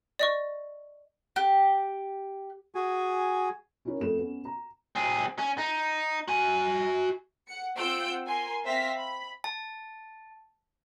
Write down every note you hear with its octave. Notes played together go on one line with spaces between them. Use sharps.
D5 D#5 C#6
G4
F#4 G#4 G#5
C#4 D#4 E4 A#4 C#5
F2 A3 E7
B3 C#4
A#5
C4 G#4
C#4
D#4
F#4 G#5
F#5 C#7
C4 F4 F#5 E6 G6 D7
A#4 G#5 C6
C4 C5 E5 F5 A#6 B6
B5
A5